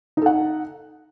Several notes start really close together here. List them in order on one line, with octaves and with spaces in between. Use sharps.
D#4 A4 F#5